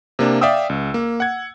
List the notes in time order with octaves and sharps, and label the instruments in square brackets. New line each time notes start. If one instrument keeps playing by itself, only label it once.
[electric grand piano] C3 A#3 D4
D5 E5 F5 G5 D#6 E6
C#2
A#3
F#5 G#6